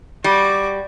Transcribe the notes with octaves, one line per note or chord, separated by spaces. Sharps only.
G3 F#4 D6